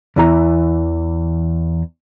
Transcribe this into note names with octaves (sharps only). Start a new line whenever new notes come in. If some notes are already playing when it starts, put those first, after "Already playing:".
E2 E3 A#5